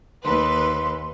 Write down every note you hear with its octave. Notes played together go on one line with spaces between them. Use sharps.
D#2 B4 C6